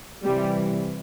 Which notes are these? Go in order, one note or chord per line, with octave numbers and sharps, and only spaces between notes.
C3 E3 G3